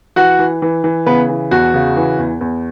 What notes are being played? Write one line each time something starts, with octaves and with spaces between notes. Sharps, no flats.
E3 F#4 F#5
E3
E3
E3
C#3 B3 B4
E3
E2 F#4
C#3
E3
E2
E2